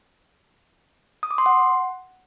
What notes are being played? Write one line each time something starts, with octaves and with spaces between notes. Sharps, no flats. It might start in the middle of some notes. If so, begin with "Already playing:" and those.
D#6
D6
C6
F#5